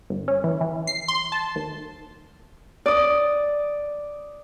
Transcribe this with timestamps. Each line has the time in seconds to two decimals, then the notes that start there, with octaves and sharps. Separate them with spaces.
0.10 G1
0.28 C#4
0.44 E3
0.61 E3
0.87 C7
1.08 C6
1.32 A5
1.56 D#2
2.86 D5 D#6